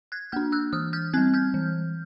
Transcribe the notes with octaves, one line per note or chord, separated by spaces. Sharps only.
F#6 G#6
A#3 D4 F6 G6
E6 F#6
E3 D#6 F6
F6 G6
G3 C4 F#6 G#6
F6 G6
E3